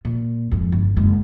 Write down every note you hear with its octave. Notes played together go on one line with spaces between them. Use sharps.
A#2
F2 G#2
G1
F#1 G#3